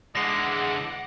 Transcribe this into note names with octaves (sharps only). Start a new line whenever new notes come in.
D3 E3 G#3 F#5 D6 A#6 C7 F7